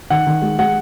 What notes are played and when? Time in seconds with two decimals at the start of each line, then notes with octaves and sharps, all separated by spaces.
0.10 D#3 F#5
0.27 D#3
0.42 G#3
0.58 G#3 F#5